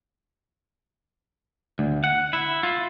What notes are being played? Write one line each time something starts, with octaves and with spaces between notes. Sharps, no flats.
D2
F#5
E4
F4